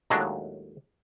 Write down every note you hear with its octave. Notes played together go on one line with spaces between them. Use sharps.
D#2 A2 F#3 G#3 D4